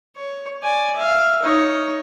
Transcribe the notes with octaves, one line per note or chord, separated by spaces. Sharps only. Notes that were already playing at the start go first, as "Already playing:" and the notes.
C#5
D5 G#5
E5 F5
D#4 C#5